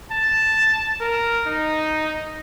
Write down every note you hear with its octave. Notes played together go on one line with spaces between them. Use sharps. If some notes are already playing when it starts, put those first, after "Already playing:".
A5
A#4
D#4